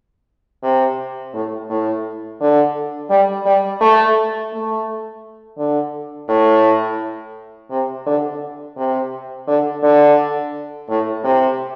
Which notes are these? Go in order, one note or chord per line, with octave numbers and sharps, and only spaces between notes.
C3
A2
A2
D3
G3
G3
A3
A3
D3
A2
C3
D3
C3
D3
D3
A2
C3